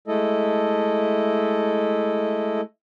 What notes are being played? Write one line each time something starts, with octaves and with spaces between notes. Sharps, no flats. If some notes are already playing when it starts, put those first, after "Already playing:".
G#3 A3 E4 A4 D#5